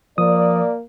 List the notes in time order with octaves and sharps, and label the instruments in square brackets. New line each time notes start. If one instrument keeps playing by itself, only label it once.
[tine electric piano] F3 D#6 [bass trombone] A#3 [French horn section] D5